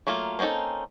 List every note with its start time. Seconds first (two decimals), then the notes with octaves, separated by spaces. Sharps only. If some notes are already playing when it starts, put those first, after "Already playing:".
0.07 F#3 A3 A#3 F4
0.39 A#3 C4 C#4 D#4 A4